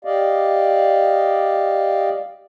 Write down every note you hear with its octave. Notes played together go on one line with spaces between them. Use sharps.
G4 D5 D#5 F5